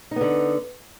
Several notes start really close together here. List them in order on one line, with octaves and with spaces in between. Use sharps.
D#4 B3 D3